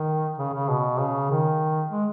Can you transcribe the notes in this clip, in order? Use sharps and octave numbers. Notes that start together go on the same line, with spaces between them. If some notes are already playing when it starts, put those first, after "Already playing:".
Already playing: D#3
C#3
C#3
B2
C#3
D#3
G#3